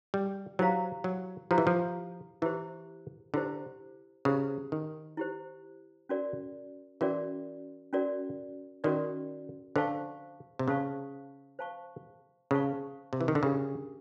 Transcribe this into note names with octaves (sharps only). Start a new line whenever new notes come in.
G3
F#3 E4 G4 C5 F5 A#5
F#3
F3 E4 G4 C5 F5 A#5
E3
F3
E3 E4 G4 C5
D3 E4 G4 C5
C#3 E4 G4 C5
D#3
E4 G4 C5
C#4 F#4 A#4 D5
E3 C#4 F#4 A#4 D5
C#4 F#4 A#4 D5
D#3 C#4 F#4 A#4 D5
D3 C5 F5 A5 C#6
C3
C#3 C5 F5 A5 C#6
C5 F5 A5 C#6
C#3 C5 F5 A5 C#6
C3
E3
D#3
D3
C#3 D4 G4 A#4